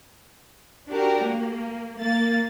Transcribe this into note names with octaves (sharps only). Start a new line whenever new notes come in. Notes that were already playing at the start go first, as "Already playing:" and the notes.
D4 F#4 G4 A#4
A#3
A#3 A6